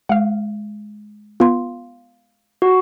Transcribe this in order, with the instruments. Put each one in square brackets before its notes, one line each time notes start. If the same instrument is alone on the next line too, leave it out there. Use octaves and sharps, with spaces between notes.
[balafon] G#3 [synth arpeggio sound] F5 F#5
[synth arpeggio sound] B3 F4 [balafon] F5 C6
[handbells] F#4